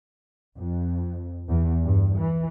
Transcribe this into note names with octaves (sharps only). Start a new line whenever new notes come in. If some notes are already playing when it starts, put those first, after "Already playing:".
F2
E2
G2
E3